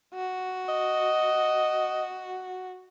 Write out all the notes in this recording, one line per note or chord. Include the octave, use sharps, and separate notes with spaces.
F#4
D#5